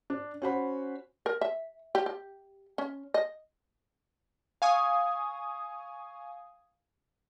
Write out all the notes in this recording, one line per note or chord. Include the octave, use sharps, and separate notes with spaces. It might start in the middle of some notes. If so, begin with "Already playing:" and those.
D4
C#4 F#4 C5 F#5 B5
A#4
E5
G4
G4
C#4
D#5
F5 G#5 C#6 D#6